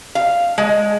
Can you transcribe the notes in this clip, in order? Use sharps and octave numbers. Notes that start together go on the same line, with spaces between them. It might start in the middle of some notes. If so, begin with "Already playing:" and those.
F5
G#3